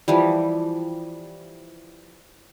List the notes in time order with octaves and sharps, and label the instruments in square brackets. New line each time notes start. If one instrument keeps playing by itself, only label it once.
[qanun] E3 F3 G3